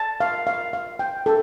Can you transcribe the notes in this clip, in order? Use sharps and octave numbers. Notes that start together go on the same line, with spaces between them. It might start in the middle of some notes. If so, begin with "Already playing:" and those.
Already playing: A5
F5
F5
F5
G5
A4